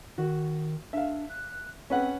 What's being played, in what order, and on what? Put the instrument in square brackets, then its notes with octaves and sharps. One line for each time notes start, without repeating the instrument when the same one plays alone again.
[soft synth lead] D#3 [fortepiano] F#4
[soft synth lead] D4 [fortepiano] E5 F5
[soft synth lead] F#6
[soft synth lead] C4 [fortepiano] C#4 B4 F#5